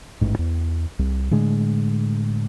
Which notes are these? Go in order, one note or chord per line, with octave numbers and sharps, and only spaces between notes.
A1 G#2
E2
C2
A2 D3 G#3